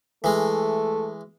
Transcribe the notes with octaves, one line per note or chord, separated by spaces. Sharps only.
E3 G#3 A3